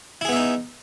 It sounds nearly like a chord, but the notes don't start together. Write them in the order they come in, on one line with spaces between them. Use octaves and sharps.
E4 G#4 B3 E5 D#4